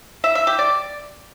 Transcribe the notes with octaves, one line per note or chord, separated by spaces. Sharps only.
E5
E5
G4
D5